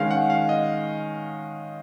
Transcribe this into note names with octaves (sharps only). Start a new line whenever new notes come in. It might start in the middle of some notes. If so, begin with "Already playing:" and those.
Already playing: D#3 G#3 C#4 F5
F#5
F5
D#5